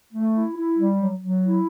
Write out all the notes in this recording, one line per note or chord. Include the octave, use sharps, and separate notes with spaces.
A3
E4
E4
G3
F#3
F#3
E4